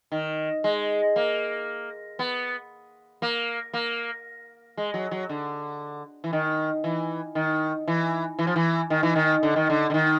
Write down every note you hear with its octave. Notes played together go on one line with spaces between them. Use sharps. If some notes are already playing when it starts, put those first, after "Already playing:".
D#3
G#3
A#3
B3
A#3
A#3
G#3
F#3
F#3
D3
E3
D#3
E3
D#3
E3
E3
F3
E3
D#3
E3
D#3
D3
D#3
D3
D3
D#3